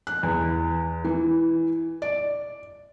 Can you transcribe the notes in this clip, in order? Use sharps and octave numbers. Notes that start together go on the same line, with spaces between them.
F#6
E2
E3
D5